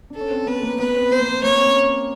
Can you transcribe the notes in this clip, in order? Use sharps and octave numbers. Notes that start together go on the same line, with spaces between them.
D4 A4
C#4
C4
B3 B4
A#3
B3 B4
C4
B3 C5
A#3
B3
A#3 C#5
C4
C#4